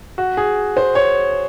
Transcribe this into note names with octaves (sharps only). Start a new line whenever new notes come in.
F#4
G#4
C5
C#5